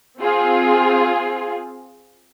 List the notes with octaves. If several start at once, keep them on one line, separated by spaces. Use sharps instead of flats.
C4 F4 G#4